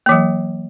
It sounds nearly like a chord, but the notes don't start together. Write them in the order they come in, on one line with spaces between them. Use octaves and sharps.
A#3 E3 F#3